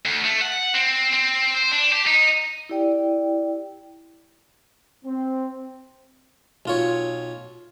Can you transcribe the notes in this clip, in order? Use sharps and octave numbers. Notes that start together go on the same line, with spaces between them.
D2
A3
F#5
C4
C4
C5
D4
G4
D#4
E4 G4 D5 G5
C4
B1 F4 C#5